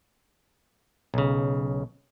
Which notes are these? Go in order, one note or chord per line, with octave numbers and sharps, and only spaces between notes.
B1 C#3